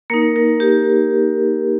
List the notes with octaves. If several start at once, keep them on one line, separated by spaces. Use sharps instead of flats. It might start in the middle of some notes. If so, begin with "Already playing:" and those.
A#3 D#4 A#4
A#4
G4